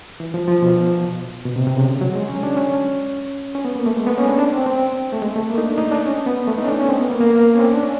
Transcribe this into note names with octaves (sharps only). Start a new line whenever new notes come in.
E3
F3
F3
B2
B2
C3
C3
C#3
D3
F#3
G#3
C#4
D4
C#4
C#4
B3
A#3
A3
G#3
B3
C#4
D4
D4
C4
C4
A3
G#3
A3
A#3
D#4
D4
D#4
D4
C#4
B3
A3
D#4
C#4
D4
C#4
C4
B3
A#3
A#3
A#3
C#4
C4
D4
C#4